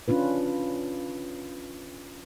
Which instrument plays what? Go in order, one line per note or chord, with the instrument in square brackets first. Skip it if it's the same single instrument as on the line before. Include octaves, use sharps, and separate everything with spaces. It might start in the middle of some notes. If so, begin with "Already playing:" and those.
[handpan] C#4 D4 F4 B4